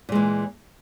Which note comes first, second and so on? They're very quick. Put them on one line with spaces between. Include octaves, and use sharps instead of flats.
A#2 G#3 E3